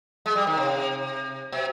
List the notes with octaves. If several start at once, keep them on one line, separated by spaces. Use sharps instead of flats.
G#3
G3
D#3
C3
B2